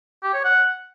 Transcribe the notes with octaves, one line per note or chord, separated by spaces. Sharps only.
G4
C#5
F#5